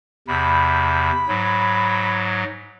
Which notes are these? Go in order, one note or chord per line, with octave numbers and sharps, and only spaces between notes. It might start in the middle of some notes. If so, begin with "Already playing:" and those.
E2 C3 B5
G#2 F#3